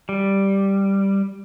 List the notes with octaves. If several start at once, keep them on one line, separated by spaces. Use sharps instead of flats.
G3